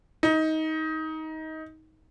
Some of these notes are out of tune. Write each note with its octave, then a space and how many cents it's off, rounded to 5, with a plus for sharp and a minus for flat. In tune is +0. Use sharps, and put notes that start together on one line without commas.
D#4 +20